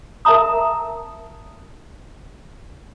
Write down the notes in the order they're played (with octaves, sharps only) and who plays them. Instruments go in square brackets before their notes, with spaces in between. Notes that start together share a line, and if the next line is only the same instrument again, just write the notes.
[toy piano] A#4 E5 A5 A#5 D#6